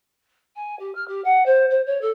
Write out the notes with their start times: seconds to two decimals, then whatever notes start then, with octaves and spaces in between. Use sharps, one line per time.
0.55 G#5
0.79 G4
0.95 F6
1.08 G4
1.24 F#5
1.45 C5
1.70 C5
1.86 C#5
2.01 A4